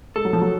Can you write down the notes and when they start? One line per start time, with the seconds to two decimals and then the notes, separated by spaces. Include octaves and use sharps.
0.16 G#3 A4
0.25 F#3
0.33 F3
0.42 F#3